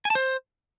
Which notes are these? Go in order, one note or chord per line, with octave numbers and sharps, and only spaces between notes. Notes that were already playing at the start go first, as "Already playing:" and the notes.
G#5
A5
C5